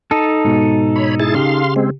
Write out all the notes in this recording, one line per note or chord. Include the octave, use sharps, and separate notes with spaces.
D#4 A4 A5
G#2 B2
C#5 B5
E4 G#4 A6
C#3 G4 F5 C6
G#3 C4